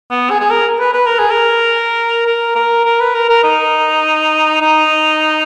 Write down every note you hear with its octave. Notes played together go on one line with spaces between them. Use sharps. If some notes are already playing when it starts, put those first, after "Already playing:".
B3
G#4
G#4
A#4
B4
B4
A#4
G#4
A#4
A#4
A#4
A#4
B4
A#4
A#4
D#4
D#4